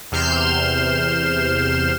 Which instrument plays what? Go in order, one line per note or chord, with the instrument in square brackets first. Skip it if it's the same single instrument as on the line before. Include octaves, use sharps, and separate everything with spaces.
[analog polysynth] E2 C3 F6 G6 C7 E7